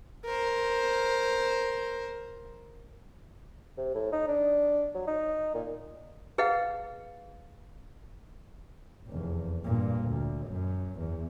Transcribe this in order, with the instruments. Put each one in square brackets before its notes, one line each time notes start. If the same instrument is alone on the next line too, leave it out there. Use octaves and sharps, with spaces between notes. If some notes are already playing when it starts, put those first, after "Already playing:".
[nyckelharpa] A#4 C5
[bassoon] C3
A2
D#4
D4
F#3
D#4
A#2
[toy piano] G#4 B4 D#5 F5 F#5
[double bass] F1 E2
G2 A#2
D2
F#2
E2